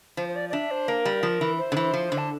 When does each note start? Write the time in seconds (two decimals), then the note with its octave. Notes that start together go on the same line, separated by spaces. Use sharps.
0.17 F3 C5
0.29 C5
0.36 D5
0.49 D5
0.53 D4 E5
0.71 C5
0.88 A#3 A#4
1.05 G3
1.23 F3
1.41 E3
1.58 C5
1.72 D3
1.77 E3
1.94 F3
2.12 D3
2.18 A5